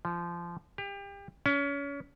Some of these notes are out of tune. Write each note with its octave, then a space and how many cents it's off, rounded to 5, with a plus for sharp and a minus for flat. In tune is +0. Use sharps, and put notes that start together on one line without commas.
F3 -20
G4 +30
C#4 +30